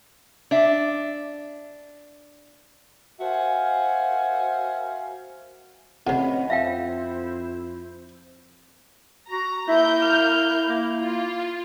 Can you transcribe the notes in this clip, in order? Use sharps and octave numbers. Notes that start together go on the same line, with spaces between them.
D4 E5
F#4 A#4 C5 E5 F5 G#5
A2 C3 C4 C#4 B4 D#5 F#5
F2 E4 C5 E5 F5 G5
F#4 A#5
A#3 E4 E5 G6
F6
A#3
F4